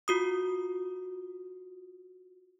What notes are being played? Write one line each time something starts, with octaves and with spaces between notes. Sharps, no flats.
F4 F#4 D#6